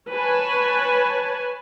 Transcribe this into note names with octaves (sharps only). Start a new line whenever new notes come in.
B4 C#5 G#5 A5